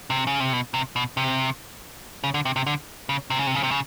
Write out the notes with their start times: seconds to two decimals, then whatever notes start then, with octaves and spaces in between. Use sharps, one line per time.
0.10 C3
0.27 C#3
0.40 C3
0.53 B2
0.74 C3
0.96 B2
1.17 C3
2.24 C#3
2.34 D3
2.45 C3
2.56 C3
2.67 D3
3.09 C#3
3.30 C3
3.39 C#3
3.47 C3
3.55 C#3
3.63 C3
3.71 C#3